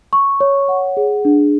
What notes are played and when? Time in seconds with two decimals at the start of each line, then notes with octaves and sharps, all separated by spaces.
0.13 C#6
0.40 C#5
0.69 F#5
0.97 G#4
1.25 D4